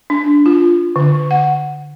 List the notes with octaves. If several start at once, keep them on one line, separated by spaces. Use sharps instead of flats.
D4
F4
D3
F#5